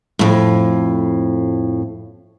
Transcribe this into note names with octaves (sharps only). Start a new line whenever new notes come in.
F2 A2